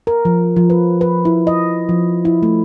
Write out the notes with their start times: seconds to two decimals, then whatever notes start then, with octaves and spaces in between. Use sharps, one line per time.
0.07 A#4
0.25 F3
0.56 F3
0.70 B4
1.01 B4
1.25 E4
1.47 D#5
1.89 F3
2.25 E4
2.43 A3